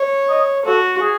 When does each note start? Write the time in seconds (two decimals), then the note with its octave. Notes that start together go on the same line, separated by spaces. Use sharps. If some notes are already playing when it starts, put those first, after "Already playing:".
Already playing: C#5
0.29 D#5
0.65 F#4 A4
1.01 G#4